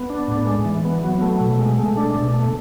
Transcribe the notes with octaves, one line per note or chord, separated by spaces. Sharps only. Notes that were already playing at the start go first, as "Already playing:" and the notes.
Already playing: B3
D4
A2
G#3
E3
B3
F#3
A3
B2
G#3
A3
D4
B2
A3